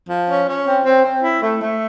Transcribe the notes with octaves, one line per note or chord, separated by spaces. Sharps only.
F3
C#4
C#4
C4
C4
C4
E4
A3
A3